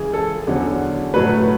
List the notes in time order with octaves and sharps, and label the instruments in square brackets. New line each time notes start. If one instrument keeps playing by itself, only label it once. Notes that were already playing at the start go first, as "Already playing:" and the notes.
Already playing: [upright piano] C#2 C#3 E3 G#4
A4
E2 D3 F#3 C#4
A2 F#3 A3 B4